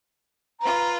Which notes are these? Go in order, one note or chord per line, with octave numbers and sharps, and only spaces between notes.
F4 B4 A#5